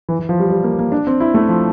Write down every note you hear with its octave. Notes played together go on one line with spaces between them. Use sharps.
E3
E3
F3
G3
G3
A#3
A#3
D4
C4
E4
A3
F3